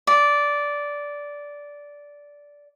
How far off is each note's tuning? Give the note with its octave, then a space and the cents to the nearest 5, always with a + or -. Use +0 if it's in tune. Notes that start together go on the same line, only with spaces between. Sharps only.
D5 -10